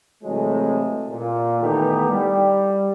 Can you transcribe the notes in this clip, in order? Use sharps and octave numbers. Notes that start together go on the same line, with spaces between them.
C3 E3 F#3 G#3 A3
A#2
D#3 E3 A3 B3 D#4 G4
G3